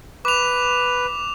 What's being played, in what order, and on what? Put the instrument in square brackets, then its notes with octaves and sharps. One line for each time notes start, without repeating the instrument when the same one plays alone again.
[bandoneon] B4 [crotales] D6 F7